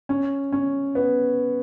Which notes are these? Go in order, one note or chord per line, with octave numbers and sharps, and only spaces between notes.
C#4
C#4
B3